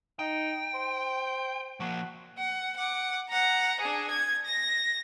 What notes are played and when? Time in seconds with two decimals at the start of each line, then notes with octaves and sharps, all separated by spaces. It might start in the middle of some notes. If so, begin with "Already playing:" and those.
0.19 D#4 G5
0.74 C5
1.80 F3 A#3 F#4
2.38 F#5
2.77 F#5 D6
3.29 F#5 A#5
3.81 D4 G#4
4.10 G#6
4.45 A#6